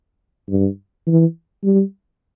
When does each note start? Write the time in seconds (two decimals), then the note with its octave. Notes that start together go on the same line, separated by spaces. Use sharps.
0.50 G2
1.07 E3
1.64 G3